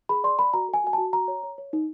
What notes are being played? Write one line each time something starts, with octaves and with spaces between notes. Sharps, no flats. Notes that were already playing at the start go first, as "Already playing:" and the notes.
G#4 B5
D5 C6
D5 B5
F#4 A#5
A4
G#5
F#4 G#5
A5
F#4
F#4 A#5
C#5
C#5
C#5
D#4